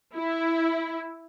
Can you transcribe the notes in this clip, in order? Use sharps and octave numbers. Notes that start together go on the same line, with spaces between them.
E4